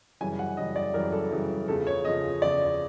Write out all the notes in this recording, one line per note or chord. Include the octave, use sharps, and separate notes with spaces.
F#2 C#3 E3 G3 G#5
F#5
F#2 C#3 E3 G3 D#5
D5
F#2 C#3 E3 G3 A#4
A4
F#2 C#3 E3 G3
E2 C#3 F3 A4
C#5
E2 C#3 F3 D#5
E2 C#3 F3 D5